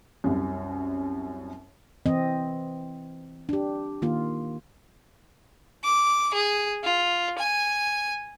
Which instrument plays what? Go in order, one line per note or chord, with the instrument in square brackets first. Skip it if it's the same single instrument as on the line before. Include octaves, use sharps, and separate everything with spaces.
[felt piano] C2 F#2
[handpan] E3 C4 D#5
D4 G4
D#3 A#3 F4
[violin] D6
G#4
F4
G#5